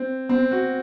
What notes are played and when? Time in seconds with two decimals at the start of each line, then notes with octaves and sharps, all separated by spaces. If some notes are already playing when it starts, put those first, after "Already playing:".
Already playing: C4
0.29 C4
0.51 F#4